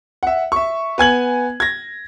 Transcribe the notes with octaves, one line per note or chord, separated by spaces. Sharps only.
E5 F#5
E5 C#6
B3 G#5 G#6 F#7
G#6 A#6